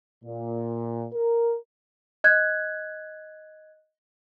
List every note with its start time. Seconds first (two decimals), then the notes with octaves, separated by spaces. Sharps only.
0.24 A#2
1.13 A#4
2.24 D#5 F#6 G#6